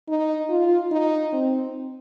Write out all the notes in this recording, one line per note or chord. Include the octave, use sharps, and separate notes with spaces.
D#4
F4
D#4
C4